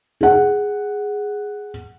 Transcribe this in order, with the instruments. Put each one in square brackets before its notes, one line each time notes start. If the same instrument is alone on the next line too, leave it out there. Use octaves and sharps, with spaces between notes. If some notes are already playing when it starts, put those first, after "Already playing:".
[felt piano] G#4 F#5